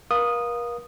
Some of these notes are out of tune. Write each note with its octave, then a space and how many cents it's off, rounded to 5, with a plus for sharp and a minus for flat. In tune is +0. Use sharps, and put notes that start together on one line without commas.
A#4 +40 F5 +15 D#6 -10